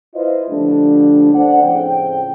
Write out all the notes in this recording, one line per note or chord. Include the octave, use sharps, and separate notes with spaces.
E4 F4 B4 C5 D#5
D3 F3 G3 A3 D4
A3 D4 C5 D5 F#5
A2 C#3 F3 C4 F4 G5